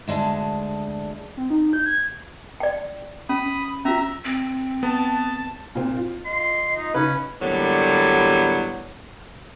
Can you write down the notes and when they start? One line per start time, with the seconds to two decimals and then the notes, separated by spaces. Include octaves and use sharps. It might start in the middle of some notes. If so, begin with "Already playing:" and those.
0.08 D2 G#3 D4 A5
1.37 C4
1.50 D#4
1.73 G6
1.86 G#6
2.60 D5 G5
3.29 C#4 B5 D#6
3.85 C#4 F4 E5 A#5
4.25 C4
4.83 B3 A5
5.75 A#2 C4
5.97 F4
6.25 D#5 C6
6.76 D#4
6.94 C#3 C#4 D#4 B4
7.41 A2 D3 F#3 G3 A#3 B3